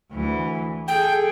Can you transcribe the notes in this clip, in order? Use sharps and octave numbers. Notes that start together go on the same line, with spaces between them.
D2 E3
G#4 A4 G5